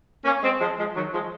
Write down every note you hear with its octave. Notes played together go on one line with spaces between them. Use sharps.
A#3 C#4
G#3 C4
F3 G#3
F3 G#3
D#3 F#3
F3 G#3